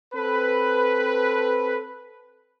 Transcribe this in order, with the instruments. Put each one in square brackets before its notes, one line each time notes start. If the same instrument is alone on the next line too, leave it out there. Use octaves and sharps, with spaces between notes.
[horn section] C4 A4 B4